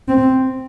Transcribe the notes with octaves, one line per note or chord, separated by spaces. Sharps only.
C4